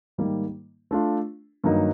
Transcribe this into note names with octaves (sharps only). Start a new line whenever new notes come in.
G#2 D#3 G3 A#3
A3 D4 F4
G2 D#3 F#3 A#3 D#4